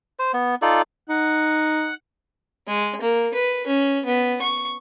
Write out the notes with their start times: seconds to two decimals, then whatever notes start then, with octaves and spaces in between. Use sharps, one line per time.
0.19 C5
0.34 B3
0.62 D#4 F4 A4 D5
1.09 D#4 F#5
2.67 G#3
3.01 A#3
3.34 B4
3.67 C#4
4.06 B3
4.42 C#6